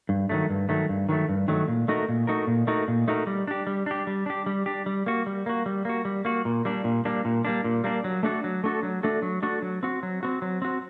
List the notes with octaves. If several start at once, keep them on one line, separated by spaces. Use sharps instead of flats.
G2
D#3 F#3 A3
G2
D#3 F#3 A3
G2
D#3 F#3 A3
G2
D#3 F#3 A3
A#2
A3 D#4 F#4 A#4
A#2
A3 D#4 F#4 A#4
A#2
A3 D#4 F#4 A#4
A#2
A3 D#4 F#4 A#4
G3
D4 G4
G3
D4 G4
G3
D4 G4
G3
D4 G4
G3
A#3 F#4
G3
A#3 F#4
G3
A#3 F#4
G3
A#3 F#4
A#2
G3 A#3 D4
A#2
G3 A#3 D4
A#2
G3 A#3 D4
A#2
G3 A#3 D4
F#3
A3 D4 F#4 A4
F#3
A3 D4 F#4 A4
F#3
A3 D4 F#4 A4
F#3
A3 D4 F#4 A4
F#3
C4 F#4
F#3
C4 F#4
F#3
C4 F#4